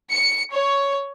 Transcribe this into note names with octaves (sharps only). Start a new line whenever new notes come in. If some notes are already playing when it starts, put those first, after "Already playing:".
C#7
C#5